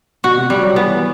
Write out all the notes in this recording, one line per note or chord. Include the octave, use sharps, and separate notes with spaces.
B2 F#4
C3
G3
F#3
E3 B3